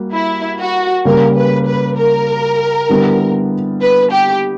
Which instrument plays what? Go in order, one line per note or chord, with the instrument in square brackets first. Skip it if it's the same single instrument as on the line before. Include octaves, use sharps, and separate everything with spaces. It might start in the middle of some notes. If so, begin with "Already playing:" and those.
Already playing: [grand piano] G3 A#3 F#4
[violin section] E4
F#4
[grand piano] C#3 G3 A#3 [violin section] A#4
[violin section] B4
B4
A#4
[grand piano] D3 G3 B3 E4
[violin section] B4
G4